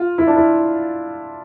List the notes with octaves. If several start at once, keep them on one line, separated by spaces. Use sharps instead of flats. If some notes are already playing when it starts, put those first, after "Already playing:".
Already playing: F4
E4
D4
E4